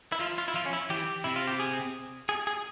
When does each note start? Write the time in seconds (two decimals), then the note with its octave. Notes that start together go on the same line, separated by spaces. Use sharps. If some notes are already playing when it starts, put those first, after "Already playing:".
0.12 E4
0.19 F3 F4
0.38 F4
0.48 E4
0.55 F3 F4
0.66 C#4
0.73 E4
0.90 E3 G4
1.24 C3 E4
1.36 F4
1.47 G4
1.60 G#4
2.29 G#4
2.47 G#4